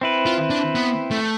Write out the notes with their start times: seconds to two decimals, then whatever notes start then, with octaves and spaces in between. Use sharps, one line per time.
0.01 C4 E4 B4
0.26 F4
0.50 D4
0.75 B3
1.11 A3